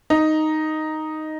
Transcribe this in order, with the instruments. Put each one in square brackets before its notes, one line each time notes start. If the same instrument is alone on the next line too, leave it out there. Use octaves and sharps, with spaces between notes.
[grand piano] D#4